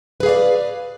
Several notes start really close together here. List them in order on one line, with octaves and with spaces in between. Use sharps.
B4 G#4 F5 D5